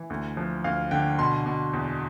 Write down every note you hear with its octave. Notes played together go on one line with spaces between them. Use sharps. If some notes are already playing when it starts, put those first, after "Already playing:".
Already playing: E3
D2
F3
D2 F5
D3 G5
B2 C6
B2
E2